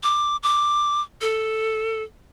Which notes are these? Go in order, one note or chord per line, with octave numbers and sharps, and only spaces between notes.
D6
D6
A4